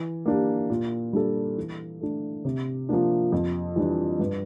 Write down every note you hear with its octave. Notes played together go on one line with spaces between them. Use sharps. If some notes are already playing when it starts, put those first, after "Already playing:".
Already playing: E3
A#3 D4 G4
A#2
G3 D4 A4
E3
A3 D4
C3
F3 A#3 D4
F2
E3 G3 D4
G2